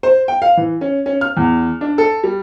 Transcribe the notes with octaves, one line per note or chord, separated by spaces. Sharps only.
C5
G5
F5
E3
C#4
C#4
F6
E2
D4
A4
G3